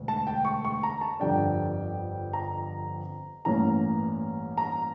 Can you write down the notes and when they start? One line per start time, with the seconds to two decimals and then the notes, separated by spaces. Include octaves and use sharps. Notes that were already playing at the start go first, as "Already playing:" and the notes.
Already playing: E1 D2
0.08 A5
0.27 G5
0.45 C#6
0.65 C#6
0.83 A#5
1.01 A5
1.20 G1 F2 D3 G3 D4 G5
2.33 A#5
3.45 A1 G2 E3 A#3 C#4 A#5
4.57 A#5